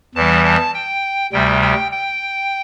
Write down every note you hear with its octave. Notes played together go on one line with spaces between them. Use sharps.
E2 E3 G3 A5
A5
G5
D2 C3 G3 G5
G5
G5